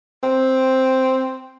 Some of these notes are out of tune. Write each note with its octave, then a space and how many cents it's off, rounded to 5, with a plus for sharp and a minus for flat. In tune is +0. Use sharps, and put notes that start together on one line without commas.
C4 +0